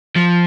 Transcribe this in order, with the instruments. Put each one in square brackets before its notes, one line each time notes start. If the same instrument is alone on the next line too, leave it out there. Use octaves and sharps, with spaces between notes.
[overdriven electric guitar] F3